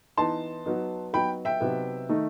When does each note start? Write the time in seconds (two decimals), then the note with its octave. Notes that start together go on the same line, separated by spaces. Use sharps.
0.17 E3 B3 D#4 A5 C6
0.66 F#3 B3 D#4
1.13 F#3 B3 D#4 G5 B5
1.45 E5 G5
1.60 C3 F#3 B3 D#4
2.09 D#3 A3 D#4